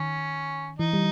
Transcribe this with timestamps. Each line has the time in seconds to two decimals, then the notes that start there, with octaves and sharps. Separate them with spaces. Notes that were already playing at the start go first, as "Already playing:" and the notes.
Already playing: D#3 C#4
0.79 E3 D#4
0.93 G3